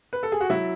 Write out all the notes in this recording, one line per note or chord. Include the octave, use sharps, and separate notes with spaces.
B4
A4
G#4
F#4
F#3 E4